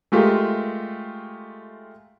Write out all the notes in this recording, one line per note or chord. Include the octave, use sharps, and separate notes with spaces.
G#3 A3 F4 G4 A#4